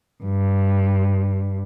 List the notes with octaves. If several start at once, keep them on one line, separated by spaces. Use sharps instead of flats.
G2